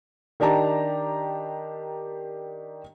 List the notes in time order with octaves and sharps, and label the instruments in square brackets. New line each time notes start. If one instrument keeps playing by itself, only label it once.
[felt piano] D#3 D4 G4 A5 A#5